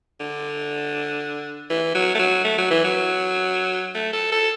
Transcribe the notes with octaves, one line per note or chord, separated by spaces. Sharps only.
D3
E3
F#3
A3
F#3
A3
F#3
E3
F#3
A3
A4
A4